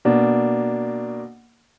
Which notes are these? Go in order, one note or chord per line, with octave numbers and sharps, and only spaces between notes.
B2 A#3 D4